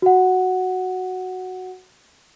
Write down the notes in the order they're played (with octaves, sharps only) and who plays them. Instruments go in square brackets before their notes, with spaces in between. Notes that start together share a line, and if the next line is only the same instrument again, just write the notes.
[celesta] F#4 F#5